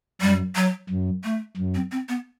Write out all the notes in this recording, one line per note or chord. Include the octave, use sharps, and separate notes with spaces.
F#2 G3
F#3
F#2
A3
F#2
C4
C4
B3